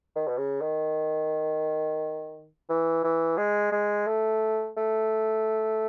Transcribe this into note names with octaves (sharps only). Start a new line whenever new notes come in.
D#3
B2
C#3
D#3
E3
E3
G#3
G#3
A3
A3